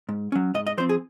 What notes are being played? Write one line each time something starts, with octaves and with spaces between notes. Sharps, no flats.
G#2
F#3 C#4
G#2 D#5
D#5
F3 C4 C5
G#4